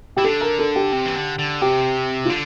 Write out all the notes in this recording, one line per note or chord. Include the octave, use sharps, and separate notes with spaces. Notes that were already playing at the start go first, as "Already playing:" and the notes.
E3 G4
D3 A4
A#4
A4
G4
C3
E3
D3
D3
C3 G4
F4
D3